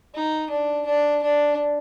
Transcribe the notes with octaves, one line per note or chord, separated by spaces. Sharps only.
D#4
D4
D4
D4